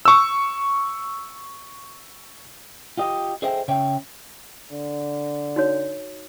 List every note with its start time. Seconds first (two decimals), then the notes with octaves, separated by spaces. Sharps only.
0.05 C#6 E6
2.97 F4 G4 D#5
3.42 G#4 A4 C5 D#5 E5 G5
3.68 C#3 C#5 E5 G5
4.72 D3
5.56 D#4 F#4 C#5